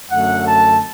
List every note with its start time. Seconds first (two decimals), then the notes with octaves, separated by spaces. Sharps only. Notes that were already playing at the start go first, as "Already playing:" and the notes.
0.10 F#2 D3 A3 F#5
0.47 A5